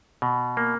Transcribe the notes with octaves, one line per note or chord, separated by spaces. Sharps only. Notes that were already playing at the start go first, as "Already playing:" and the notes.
B2
A#3